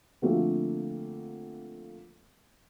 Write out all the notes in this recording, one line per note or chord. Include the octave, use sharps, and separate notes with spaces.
D3 F3 A3 A#3 C4